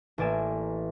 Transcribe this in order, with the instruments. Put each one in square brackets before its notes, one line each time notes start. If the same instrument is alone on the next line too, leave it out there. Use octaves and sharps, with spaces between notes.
[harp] A1 A#3 D5 G#5 E7